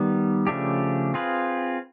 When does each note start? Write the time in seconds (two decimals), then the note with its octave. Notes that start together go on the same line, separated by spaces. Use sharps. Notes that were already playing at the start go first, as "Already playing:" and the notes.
Already playing: D#3 G3 B3
0.47 C#3 F3 A3 D4 G4
1.14 C4 F4 G#4 B4